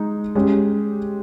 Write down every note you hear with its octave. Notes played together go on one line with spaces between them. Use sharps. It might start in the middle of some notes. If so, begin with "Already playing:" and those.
Already playing: G#3 D#4
G#3 C#4 G4